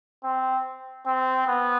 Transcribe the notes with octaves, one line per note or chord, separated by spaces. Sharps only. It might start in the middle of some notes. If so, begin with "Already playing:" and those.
C4
C4
B3